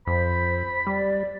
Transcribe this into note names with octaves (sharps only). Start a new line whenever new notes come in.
F2 C5 B5
G3 D5